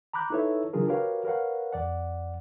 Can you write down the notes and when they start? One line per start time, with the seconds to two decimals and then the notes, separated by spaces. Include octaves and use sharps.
0.13 A#5 B5 D6 F#6 G6
0.30 D#4 E4 A4 B4 C#5 E5
0.73 C#3 F#3 D4 F4 G#4 A#4
0.88 F#4 G4 A#4 B4 C#5 F5
1.25 A#4 B4 C#5 F5 F#5
1.72 F2 D5 F#5